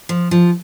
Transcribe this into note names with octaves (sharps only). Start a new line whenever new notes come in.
F3
F3